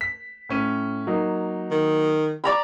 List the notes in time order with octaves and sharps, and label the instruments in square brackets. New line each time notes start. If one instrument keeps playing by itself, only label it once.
[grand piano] B6
A2 C#4 D#7
F#3 A#3 D#4
[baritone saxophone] D#3
[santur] D5 A#5 B5